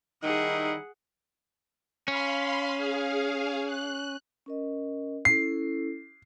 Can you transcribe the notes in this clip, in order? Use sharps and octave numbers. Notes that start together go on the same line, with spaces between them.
D#3 G3 D#4 E4 G#4 F#5
C#4 F5 B5 C6
G#4 F5
F#6
C#4 A#4 D#5
C#4 E4 A4 C7